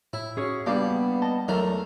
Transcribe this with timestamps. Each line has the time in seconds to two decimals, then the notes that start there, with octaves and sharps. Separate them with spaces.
0.13 A2 E4
0.37 C#4 F#4 G#4 C#5
0.66 C#3 G3 A#3 B3 D4 D6
1.22 D#5 A5
1.48 E2 F#3 A3 A#4